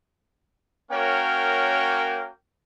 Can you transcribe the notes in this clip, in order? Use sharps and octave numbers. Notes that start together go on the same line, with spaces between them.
A#3 C#4 F#4 A#4 C#5 G5